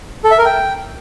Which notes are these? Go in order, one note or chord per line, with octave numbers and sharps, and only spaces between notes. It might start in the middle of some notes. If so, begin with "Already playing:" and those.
A4
E5
A#4
G5